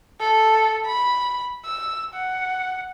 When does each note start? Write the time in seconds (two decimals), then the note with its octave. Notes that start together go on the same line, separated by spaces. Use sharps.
0.20 A4
0.86 B5
1.65 E6
2.14 F#5